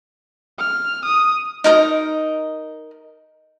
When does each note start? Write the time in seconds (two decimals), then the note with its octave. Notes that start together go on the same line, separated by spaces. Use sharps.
0.59 F6
1.05 D#6
1.64 D#4 A#4 D#5